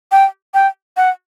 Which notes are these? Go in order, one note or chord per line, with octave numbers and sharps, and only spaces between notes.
G5
G5
F#5